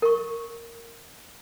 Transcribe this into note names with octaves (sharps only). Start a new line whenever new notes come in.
A#4 C#6